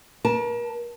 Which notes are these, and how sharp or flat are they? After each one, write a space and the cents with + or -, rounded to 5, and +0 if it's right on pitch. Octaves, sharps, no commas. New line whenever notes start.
A#4 +40 A5 +0